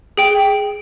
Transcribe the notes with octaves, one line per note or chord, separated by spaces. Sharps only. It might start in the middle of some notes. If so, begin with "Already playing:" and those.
G#4 G5